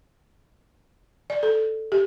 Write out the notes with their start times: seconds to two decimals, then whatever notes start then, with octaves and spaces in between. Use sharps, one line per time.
1.30 D5
1.43 A4
1.92 G4